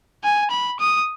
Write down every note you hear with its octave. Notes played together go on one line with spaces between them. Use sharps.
G#5
B5
D#6